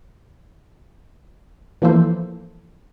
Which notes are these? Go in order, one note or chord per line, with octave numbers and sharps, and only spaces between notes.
E3 F3 A#3 E4 A4 C5